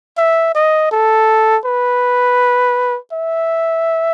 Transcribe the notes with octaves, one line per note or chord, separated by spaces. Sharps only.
E5
D#5
A4
B4
E5